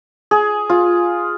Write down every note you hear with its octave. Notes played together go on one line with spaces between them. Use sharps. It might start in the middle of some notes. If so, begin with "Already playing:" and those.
G#4
F4